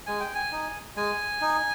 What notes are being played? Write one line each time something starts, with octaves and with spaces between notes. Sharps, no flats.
G#3 G#5
G5
G#5
D#4
G#3 G#5
D#4